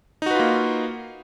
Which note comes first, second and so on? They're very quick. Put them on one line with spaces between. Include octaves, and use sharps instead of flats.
D#4 F#4 B4 F4 A#3